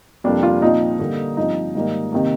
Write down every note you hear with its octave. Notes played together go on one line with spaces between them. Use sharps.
F2 C3 G3 A#3 D4
F4
A#2 F3 C4 D#4
D3 G3 A#3
G2 F3 C4 D#4
G#2 D#3 G3 A#3
C3 D#3 A#3